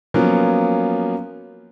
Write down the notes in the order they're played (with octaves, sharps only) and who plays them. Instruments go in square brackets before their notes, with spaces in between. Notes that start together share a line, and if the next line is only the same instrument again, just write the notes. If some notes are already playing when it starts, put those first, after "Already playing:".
[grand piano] F3 F#3 A#3 B3 C#4